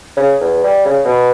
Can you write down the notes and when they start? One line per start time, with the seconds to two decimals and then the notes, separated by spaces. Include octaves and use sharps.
0.17 C#3
0.41 E2
0.64 G3
0.85 C#3
1.05 B2